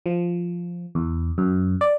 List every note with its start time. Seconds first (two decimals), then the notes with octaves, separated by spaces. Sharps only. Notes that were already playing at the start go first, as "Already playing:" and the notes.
0.06 F3
0.95 E2
1.38 F#2
1.81 D5